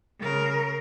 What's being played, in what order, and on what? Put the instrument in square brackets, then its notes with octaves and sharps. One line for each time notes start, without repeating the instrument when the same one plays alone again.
[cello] C#3 A#4